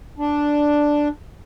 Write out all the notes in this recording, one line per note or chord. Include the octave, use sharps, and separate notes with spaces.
D4